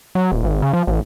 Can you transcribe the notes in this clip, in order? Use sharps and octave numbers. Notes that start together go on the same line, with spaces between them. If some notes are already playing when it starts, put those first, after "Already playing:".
F#3
D#1
G#1
C#3
F3
A1